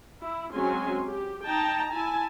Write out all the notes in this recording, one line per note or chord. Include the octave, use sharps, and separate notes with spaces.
E4
F#3 G#3 C4 C#4 G#5 C6
G4
D#4 G5 A5 A#5
E4 G#5 A5